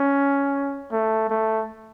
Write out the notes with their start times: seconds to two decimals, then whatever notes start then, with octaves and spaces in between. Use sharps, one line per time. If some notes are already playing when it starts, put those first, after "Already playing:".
Already playing: C#4
0.92 A3
1.30 A3